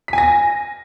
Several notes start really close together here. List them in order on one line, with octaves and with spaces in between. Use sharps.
B6 G#5 A#6